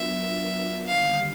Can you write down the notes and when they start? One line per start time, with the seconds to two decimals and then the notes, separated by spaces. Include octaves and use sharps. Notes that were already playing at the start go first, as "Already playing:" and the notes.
Already playing: F#3 B3 D4 F4 A#4 E5
0.87 D#2 D3 G3 F5